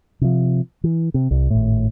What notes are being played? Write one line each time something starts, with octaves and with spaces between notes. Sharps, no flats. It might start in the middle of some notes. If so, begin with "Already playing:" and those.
C3 F3
E3
C3
C2
G#1 A2